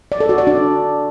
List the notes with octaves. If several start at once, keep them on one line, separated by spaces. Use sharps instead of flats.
D5
A4
F#4
D5
D4